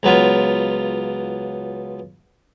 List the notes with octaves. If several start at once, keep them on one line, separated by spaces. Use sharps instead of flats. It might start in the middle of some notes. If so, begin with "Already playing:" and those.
C#2 F#3 B3 F4